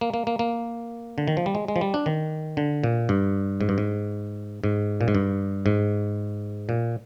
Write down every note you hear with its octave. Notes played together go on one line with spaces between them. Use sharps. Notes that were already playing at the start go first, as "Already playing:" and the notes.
A#3
A#3
A#3
A#3
D3
D#3
F3
G3
G#3
G#3
F3
G3
D4
D#3
D3
A#2
G2
G#2
G2
G#2
G#2
A#2
G#2
G2
G#2
A#2